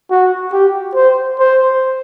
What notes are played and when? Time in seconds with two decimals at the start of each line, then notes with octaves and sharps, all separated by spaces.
0.10 F#4
0.53 G4
0.95 C5
1.39 C5